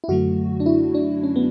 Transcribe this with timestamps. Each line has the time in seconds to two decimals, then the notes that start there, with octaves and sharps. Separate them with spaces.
0.04 E4
0.08 F#2 D3 F#3 A3 F#4
0.60 D4
0.66 E4
0.95 D4
1.23 C#4
1.36 B3